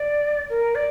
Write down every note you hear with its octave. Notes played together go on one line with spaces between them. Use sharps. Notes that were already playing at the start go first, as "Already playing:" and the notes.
Already playing: D5
A#4
D5